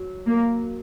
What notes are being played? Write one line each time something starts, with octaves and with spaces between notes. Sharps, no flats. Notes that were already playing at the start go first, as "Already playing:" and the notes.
Already playing: F#3
A#3